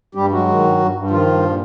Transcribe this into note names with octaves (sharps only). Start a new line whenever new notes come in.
G2 G3 G4
F#3 G#3 F#4
D#3
G2
G2
G2
D#3 F3 F4
G2
A#2